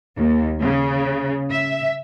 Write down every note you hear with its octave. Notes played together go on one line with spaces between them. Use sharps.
D#2
C#3
E5